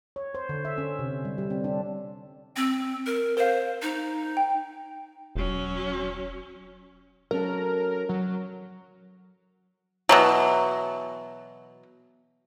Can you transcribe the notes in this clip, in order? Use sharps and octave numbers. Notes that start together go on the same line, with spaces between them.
C#5
C5
D3
E5
C#4
C3
G3
G3
C4
D4
C4
A#4
A#4 C5 F5
D#4
G5
E1 F#3 C#4
F#3 C#4 A4 A#4
F#3
B2 E3 F#3